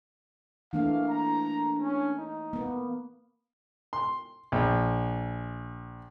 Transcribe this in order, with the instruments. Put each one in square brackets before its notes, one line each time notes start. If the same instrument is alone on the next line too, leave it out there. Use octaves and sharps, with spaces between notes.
[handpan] E3 A3 A#3 [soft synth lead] D4 [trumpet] F5
[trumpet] A#5
C#4
D#4
[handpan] A#3 B3
[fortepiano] C6
A#1